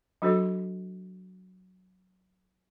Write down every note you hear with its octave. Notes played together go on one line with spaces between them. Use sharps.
F#3 D4 F#4 A4 C5